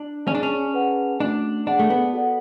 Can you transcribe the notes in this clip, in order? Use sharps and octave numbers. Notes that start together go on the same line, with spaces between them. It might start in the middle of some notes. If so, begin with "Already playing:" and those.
Already playing: D4
C#4 G#4 D5 A5
D4
C#4
G#4 B4 F#5 A5
A3 C#4 D4 F#4
D4 G#4 D5 F#5 A5
A3
B3
F#4 A4 D5 F#5